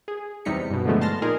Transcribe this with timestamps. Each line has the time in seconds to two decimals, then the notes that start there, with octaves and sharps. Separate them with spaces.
0.08 G#4
0.45 E2 C3 G3 D#4 B6 C#7
0.70 G2 B2
0.85 D3 E3 F3 G#3 A3 B3
1.01 A5 C6 F6 A6 A#6
1.22 A#2 D#4 G#4 A#4